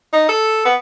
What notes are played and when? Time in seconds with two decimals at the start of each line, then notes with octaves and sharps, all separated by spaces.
0.13 D#4
0.29 A4
0.65 B3